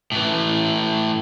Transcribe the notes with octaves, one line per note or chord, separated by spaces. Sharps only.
A2 E3